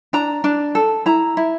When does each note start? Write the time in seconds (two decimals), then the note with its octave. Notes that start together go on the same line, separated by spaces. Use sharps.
0.13 D4 A#5
0.44 D4
0.75 A4
1.06 E4 A#5
1.37 E4